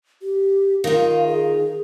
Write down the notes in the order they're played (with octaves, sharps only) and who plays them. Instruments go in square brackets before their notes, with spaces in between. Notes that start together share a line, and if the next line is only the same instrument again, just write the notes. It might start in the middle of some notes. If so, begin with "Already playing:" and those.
[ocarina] G4
[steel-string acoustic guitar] D#3 F4 [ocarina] F5
[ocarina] G#4